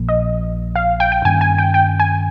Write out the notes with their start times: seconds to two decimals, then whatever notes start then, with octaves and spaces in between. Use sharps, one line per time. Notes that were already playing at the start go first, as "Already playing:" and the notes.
Already playing: A#1 A#2 F3 A#3
0.09 D#5
0.76 F5
1.00 G5
1.12 G5
1.25 G2 D#3 A#3 C#4 G#5
1.41 G#5
1.58 G5
1.74 G5
2.00 G#5